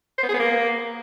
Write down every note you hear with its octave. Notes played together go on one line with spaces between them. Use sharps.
C5
B3
G#4
B3
A#3